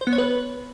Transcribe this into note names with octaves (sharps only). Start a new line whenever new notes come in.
C5
B3
C#5
B4